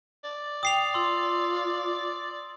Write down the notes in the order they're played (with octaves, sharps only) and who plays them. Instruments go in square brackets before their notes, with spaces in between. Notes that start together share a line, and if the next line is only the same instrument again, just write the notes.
[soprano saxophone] D5
[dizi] G5 [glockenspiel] D#6 C7 F7
[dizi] F4 [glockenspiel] C6 E6